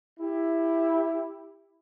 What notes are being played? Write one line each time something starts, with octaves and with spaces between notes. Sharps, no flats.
E4 G4